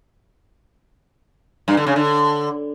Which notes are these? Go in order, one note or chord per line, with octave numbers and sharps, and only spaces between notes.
G2
D3
C#3
D3